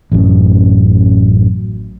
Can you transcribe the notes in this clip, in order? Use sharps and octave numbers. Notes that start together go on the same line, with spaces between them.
A1 F#2